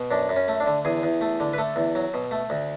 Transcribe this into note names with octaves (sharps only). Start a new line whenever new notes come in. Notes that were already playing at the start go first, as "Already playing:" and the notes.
Already playing: B2
F#2 D4
F#2
C#4
A3
D4
D3
E2 G#4
E2
A3
D3
B4
A3 A4
E2
F#3
B2
A3
D2